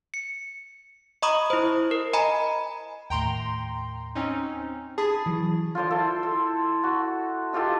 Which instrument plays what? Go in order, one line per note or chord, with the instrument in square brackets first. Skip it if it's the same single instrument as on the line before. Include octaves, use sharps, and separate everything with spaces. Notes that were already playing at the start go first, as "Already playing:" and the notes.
[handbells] C#7
D#5 A#5 B5 C#6 D#6
E4 C5
A#4
D#5 G#5 A#5 B5
[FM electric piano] D#2 A2 [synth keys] G5 A#5 C6
[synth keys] C4 C#4 D#4
[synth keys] G#4 [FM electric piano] A5 B5
[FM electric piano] E3 F#3
[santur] F4 A4 C5 D5
E4 A4 C5
A4
F#4
D#4 F4 G4 A4